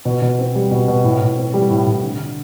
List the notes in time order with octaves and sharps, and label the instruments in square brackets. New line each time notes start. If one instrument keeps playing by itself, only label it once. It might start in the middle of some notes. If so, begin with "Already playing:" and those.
[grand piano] B2
B2
C4
G3
B2
B2
A2
A2
C4
G3
A2
A2
D3
D3